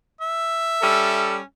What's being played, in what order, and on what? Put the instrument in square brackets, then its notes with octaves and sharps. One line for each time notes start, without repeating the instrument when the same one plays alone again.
[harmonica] E5
[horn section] G3 C#4 A4